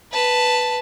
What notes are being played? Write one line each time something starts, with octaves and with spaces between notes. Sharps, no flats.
B4 A5